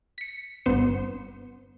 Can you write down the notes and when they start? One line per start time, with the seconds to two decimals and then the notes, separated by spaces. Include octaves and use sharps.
0.18 B6 C#7
0.66 G1 B3 C5 C#7